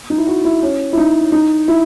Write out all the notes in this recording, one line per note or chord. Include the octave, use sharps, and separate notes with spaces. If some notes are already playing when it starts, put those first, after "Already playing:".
D#4
E4
F#4
E4
C#4
E4
D#4
D#4
E4